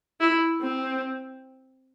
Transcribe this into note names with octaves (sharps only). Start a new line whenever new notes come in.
E4
C4